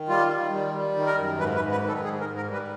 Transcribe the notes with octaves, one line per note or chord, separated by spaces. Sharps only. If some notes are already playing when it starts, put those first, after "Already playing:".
Already playing: D#3
G3 F4
D#3
G3
G3
D#3
A#4
F#2
G#2 B4
B4
G#2
B4
D#3
A4
G#2 G#4
A#4
G#2
A#4
G3
B4